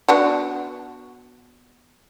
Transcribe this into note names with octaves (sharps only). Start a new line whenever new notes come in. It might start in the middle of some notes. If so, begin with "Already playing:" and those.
B3 D4 F#4